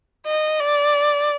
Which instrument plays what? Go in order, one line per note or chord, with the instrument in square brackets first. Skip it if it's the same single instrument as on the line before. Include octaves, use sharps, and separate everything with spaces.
[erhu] D#5
D5